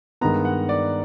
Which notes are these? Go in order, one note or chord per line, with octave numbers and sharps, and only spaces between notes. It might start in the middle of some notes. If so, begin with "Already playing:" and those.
G2 D#3 G#3 B3 A#5
F#5
D5